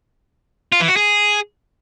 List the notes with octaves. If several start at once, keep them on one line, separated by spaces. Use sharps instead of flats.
F4
E3
F#4
G#4